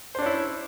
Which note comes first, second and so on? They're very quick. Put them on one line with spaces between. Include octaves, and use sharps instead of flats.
C5 D4 C#4 E4